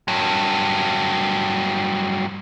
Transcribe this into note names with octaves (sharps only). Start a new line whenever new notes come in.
G2 F#3